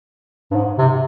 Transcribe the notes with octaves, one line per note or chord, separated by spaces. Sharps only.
G2
G#2
C3